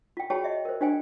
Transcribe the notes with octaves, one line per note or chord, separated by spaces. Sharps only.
F4 G5
F#4 G#4 C#5 G5 A5 B5
D#5 E5
A#4 C5
D4 F4 C5 G5 G#5